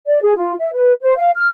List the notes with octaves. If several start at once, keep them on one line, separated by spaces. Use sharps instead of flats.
D5
G#4
F4
E5
B4
C5
F5
F6